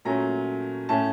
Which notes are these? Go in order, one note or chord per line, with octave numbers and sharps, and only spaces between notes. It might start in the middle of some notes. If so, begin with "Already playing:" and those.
A#2 F#3 A3 C#4 A#5
A2 A3 C#4 A5